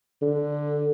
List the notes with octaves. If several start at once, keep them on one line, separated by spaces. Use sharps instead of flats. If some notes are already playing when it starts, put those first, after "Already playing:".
D3